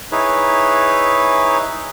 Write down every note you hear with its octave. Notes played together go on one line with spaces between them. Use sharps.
D#4 E4 G#4 B4 C#5